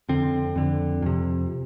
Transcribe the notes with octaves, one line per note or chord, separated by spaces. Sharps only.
F2 D3 C4
F2 D3
F2 C3